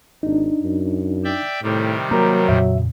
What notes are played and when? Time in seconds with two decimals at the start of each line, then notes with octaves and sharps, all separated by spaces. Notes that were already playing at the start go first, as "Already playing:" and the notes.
0.23 G#1 D4 D#4
0.62 F#2
1.24 D5 E5 G5
1.63 A2 C3 D#3 G3
2.11 F#3 A#3 A#4 A#5
2.48 F2 A#2 C#3 E5